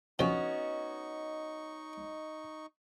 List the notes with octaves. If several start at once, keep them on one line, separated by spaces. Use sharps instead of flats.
C#3 F3 B3 C#4 D#4 F#4 D#5 C#6